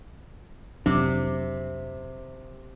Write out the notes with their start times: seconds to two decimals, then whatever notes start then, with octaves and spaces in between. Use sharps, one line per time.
0.86 F2 C3 F#3 D4